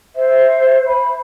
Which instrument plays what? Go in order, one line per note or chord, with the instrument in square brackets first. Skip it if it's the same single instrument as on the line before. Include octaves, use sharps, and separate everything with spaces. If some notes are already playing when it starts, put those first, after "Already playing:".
[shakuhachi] C5 [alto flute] E5
[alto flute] B5